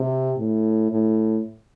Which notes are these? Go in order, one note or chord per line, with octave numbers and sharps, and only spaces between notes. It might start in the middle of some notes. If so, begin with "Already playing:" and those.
Already playing: C3
A2
A2